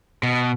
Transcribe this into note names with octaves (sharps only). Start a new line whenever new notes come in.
B2